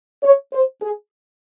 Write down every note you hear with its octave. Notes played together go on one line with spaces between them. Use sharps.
C#5
C5
G#4